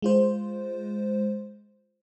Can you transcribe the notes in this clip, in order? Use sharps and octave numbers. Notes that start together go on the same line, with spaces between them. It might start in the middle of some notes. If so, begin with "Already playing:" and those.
G#3 F4 C5